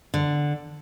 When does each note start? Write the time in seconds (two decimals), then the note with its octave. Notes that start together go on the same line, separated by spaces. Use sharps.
0.14 D3